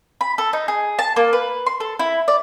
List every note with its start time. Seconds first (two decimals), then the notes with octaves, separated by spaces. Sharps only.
0.21 B5
0.38 A4
0.53 D#4
0.68 G#4
0.99 A5
1.16 A#3
1.33 B4
1.67 C6
1.80 A4
1.99 E4
2.28 D5